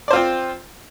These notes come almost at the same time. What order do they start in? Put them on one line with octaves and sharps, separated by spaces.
D5 C5 F4 C4